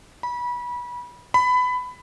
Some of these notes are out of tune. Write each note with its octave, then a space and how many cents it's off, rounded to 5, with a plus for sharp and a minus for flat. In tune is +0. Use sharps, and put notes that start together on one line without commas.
B5 -25
B5 +20